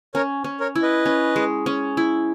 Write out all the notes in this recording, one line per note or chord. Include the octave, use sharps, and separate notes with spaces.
C#4 A#4 C#5
C#4
A#4 C#5
E4
B4 D#5
C#4
G#3
C#4
E4